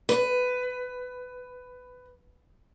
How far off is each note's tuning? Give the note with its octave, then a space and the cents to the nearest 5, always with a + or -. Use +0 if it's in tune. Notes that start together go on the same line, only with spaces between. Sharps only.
B4 +15